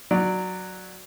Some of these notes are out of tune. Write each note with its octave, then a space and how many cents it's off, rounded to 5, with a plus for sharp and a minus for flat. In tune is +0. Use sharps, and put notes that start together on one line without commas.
F#3 +0 D5 +0